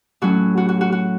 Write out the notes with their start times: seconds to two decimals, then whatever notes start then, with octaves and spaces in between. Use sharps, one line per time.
0.21 A2 F#3 C#4 F#4
0.57 F#4
0.69 F#4
0.81 F#4
0.92 F#4